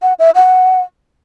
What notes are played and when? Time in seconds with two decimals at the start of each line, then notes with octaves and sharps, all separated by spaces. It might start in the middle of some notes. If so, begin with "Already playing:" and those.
0.02 F#5
0.19 E5
0.35 F#5